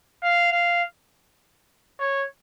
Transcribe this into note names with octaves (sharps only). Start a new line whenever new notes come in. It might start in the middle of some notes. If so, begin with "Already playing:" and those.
F5
F5
C#5